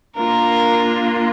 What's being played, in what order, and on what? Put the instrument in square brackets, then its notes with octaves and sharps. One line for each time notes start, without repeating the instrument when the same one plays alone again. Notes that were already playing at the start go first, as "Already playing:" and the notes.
[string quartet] A#3 D4 F4 [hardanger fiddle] A#4